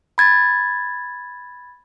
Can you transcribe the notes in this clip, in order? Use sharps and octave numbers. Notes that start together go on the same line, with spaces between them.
B5 G#6 A6